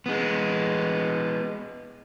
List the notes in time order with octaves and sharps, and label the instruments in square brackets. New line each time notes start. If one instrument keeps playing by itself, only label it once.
[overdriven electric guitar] G#3 B3